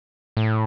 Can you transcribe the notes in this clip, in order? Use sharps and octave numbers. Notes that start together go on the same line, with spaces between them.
A2